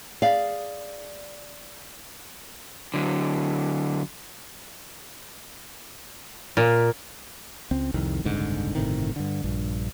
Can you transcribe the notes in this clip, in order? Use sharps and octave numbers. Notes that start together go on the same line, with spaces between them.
G#4 D5 F5
D3 F#3
A#2
C#2 C4
C2 F2 D#3
F#1 C2 G#2 D3
G1 A2 C3 D#3
G2 D3
A#1 G2